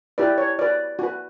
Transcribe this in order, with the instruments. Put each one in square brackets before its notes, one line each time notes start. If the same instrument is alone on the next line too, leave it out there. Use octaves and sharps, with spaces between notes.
[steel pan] E4 G4 B4 D5
C#5
F#4 B4 D5
F#4 B4